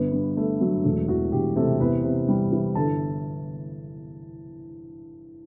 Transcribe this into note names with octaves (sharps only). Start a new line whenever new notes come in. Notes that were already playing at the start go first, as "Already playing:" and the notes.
Already playing: G1 B3 B4
G2
A3
F#3
E1 A3 A4
E2 F#4
E1 G4
C3 A3 A4
E2 B3 B4
C3
G3
E3
G1 A4 A5